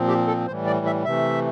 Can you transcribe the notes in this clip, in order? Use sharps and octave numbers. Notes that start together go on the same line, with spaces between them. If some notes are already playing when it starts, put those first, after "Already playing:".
Already playing: A#2 F3 C4
G4
A4
A2 E3 G3 C5
D5
E5
C3 E3 A3 E5